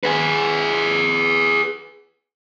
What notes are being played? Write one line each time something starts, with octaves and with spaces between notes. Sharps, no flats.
G#4 B4